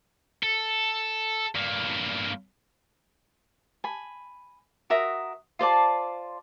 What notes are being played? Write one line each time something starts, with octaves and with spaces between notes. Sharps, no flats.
A4
G2 A#3
G#5 B5
F#4 A#4 E5 D#6
F4 C5 D5 A5